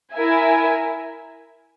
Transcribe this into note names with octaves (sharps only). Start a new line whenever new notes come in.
E4 A#4 E5 G#5